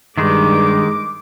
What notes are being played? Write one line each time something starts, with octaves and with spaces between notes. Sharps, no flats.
G2 D#3 G#3 D6